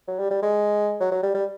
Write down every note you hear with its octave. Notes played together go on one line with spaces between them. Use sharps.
F#3
G3
G3
G#3
F#3
F#3
G3
G3